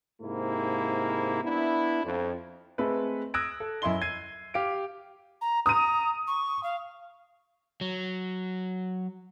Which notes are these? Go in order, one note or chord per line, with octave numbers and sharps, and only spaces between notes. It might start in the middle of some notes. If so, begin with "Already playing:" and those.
G#2 C3 A#3 E4
B3 D4 E4
F2
G#3 A3 C4 A4 B4
D#6 E6 F#6 G#6 A#6 D7
A4
F#2 E4 D#5 C6 G7
G#6 C7 D#7
G4 F5 D7
A#5
A#5 D#6 D#7
C#6
F5
F#3